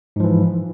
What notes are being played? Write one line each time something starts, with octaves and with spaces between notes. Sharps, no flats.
G#2 E3 F3